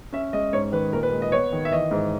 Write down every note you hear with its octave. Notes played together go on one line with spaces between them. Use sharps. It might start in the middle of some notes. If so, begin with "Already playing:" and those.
C#4 E5
G#3 D#5
G#2 C#5
D#3 B4
A#2 A#4
B4
G#3
D#5
B3 C#5
D#3
E5
E3 D#5
G#2